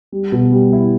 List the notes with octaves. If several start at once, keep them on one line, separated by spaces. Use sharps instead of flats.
G3
B2
G3
E4